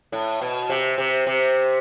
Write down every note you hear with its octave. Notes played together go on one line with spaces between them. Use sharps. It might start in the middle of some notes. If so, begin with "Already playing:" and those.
A2
B2
C3
C3
C3